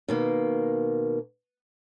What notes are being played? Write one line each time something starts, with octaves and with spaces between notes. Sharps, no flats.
B2 D#3 A#3